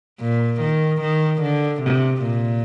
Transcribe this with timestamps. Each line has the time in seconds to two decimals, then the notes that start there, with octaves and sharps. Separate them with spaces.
0.21 A#2
0.61 D#3
1.02 D#3
1.42 D3
1.82 C3
2.23 A#2